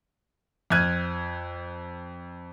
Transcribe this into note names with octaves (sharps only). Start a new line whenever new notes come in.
F2 F6 F#6 G#6 D#7